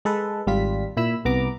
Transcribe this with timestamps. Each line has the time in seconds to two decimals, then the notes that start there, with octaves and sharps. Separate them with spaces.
0.05 G#3 A4 B4
0.47 G#1 G3 F4 B6
0.97 A#2 E4 B5 E6
1.25 C2 B3 A#5 D6